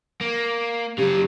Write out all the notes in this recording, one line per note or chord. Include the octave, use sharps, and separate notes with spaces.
A#3
C#3 F#3 G4